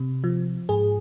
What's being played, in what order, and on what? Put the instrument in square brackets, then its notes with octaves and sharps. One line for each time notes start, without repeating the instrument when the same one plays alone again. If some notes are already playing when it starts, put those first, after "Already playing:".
Already playing: [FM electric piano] C3
F3
G#2 G#4